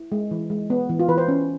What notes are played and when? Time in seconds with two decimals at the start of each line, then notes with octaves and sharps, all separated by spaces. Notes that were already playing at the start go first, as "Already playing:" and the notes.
Already playing: E4
0.12 G#3
0.31 E3
0.50 G#3
0.70 B3
0.89 E3
0.99 F4
1.08 E3 B4
1.18 C5
1.28 C#4